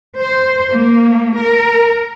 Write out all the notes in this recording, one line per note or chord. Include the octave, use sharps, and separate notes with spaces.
C5
A#3
A#4